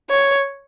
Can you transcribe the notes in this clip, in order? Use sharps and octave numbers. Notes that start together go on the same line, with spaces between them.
C#5